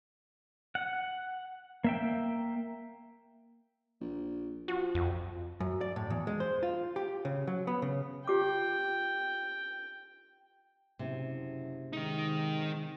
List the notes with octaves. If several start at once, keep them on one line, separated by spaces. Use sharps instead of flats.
F#5
A#3 E5 G5
A#1
F3 F#4
F2
F#2
D5
A2
E2
G#3
C5
F4
G4
C#3
F#3
B3
C#3
F4 G4 G5 D6
F#1 C3
G#2 D#3 D#4